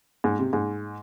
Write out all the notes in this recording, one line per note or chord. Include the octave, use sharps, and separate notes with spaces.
G#2
C3
G#2